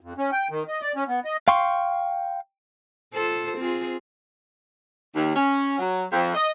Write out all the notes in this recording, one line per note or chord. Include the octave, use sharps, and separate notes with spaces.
F2
C#4
G5
D#3
D#5
D5
C#4
B3
D#5
F5 G5 C6 C#6
F4 A4 C5
C4 F4 G#4
D#2
C#4
F#3
F2
D#5